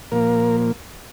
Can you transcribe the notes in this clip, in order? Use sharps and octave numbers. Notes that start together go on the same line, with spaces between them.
A#2 F3 A#3 A#4